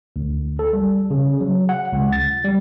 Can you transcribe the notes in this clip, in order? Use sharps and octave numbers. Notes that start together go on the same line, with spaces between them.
D2
A4
G3
C#3
F#3
F#5
C#2
A6
G3